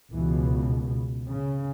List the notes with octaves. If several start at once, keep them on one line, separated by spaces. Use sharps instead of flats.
C#2 B2 E3
C#3